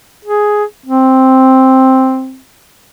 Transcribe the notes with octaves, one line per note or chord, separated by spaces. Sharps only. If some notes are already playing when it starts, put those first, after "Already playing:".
G#4
C4